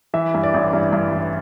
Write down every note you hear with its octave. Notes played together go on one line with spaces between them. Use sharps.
E3 E5
G2
D5
A1
G2
G2
A1